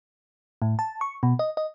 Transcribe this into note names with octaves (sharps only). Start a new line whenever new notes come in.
A2
A5
C#6
B2
D#5
D#5